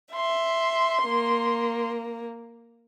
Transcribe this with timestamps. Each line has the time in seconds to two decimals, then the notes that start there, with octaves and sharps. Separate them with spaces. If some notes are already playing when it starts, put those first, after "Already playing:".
0.14 E5 C6
1.05 A#3